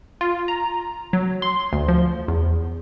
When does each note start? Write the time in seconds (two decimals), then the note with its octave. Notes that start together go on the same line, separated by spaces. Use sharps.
0.21 F4
0.48 A#5
1.13 F#3
1.42 C6
1.73 D2
1.88 F3
2.28 E2